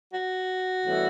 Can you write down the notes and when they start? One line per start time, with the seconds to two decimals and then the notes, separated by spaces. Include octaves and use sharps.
0.11 F#4
0.84 A2 E3 G3 B3